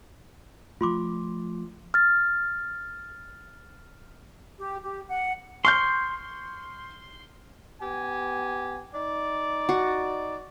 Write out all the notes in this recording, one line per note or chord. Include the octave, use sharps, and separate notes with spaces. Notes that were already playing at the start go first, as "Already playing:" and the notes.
F3 A3 F4 C6 D6
F6 A6
G4
G4
F#5
C6 C#6 F6 G6
B3 G4 G#5
D#4 D5
F#4